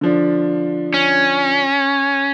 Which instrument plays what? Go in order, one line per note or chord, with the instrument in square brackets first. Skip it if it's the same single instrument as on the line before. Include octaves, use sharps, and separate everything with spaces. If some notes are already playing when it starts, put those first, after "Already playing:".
[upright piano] D3 F3 D4
[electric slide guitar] C#4